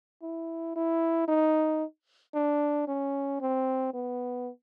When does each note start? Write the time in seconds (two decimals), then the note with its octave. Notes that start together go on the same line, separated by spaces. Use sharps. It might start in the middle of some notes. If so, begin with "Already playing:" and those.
0.22 E4
0.76 E4
1.28 D#4
2.34 D4
2.88 C#4
3.41 C4
3.94 B3